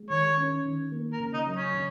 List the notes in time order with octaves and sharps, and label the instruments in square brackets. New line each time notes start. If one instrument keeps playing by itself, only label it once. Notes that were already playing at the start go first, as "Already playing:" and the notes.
Already playing: [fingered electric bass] G#3
[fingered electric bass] D#3 [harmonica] C#5
[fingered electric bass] C#4
D#3
A#3
[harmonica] A#4
[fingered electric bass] C#3
[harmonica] D#4
[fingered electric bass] F#3
[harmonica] C#4
[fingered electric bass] C#3